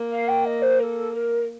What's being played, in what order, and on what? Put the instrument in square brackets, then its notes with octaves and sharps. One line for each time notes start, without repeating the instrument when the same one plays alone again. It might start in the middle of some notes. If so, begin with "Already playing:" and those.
Already playing: [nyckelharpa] A#3
[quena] F5
G5
D#5
C5
A#4
A4
A#4